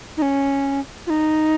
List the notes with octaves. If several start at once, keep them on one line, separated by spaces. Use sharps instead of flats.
D#4
C#4
F4
D#4